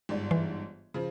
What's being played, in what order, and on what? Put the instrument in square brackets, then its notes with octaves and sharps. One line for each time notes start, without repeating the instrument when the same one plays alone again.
[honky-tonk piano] G1 G#2 D5
[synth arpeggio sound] E3
[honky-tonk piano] C#3 F3